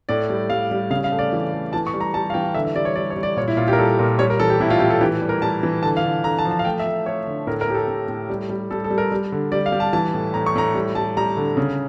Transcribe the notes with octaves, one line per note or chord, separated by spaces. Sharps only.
A2 D5
G3
G3 F5
G3
C#3 F5
F5
A3
D5
E3
A3
E3 A5
C#6
G3
A#5
G3 A5
F5
E3 G5
D3 E5
E5
G3 D5
C#5
G3 D5
C#5
G3
D5
A#2 C#5
E4
A#2 F4
G4
A#4
G3 A4
A#2 A#4
G3 C#5
A#4
E3 A4
G4
A2 E4
F4
E3 G4
A4
E3 G4
G3
A#4
G3 A5
E3
D3 A5
F5
D3
D3 A#5
A5
F3
A5
F5
A3 G5
E5
A3
A3 C#5
D3
A2 A#4
A#4
A2 G4
A4
A2
A2
G3
G3
G3 A4
A4
G3
A#4
G3
D3
G3 D5
F5
G3
A5
E3 A5
A2
A2 A#5
C#6
A2 A#5
G3
G3 A5
G3 A#5
D3
C#3